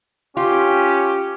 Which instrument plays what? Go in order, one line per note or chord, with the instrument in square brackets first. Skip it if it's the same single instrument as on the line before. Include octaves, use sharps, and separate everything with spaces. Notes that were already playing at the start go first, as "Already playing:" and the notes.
[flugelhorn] C#4 [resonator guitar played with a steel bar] F4 [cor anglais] G4